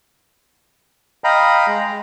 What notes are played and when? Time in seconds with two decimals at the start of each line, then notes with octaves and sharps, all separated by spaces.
1.24 D#5 F5 G5 A#5 B5
1.67 G#3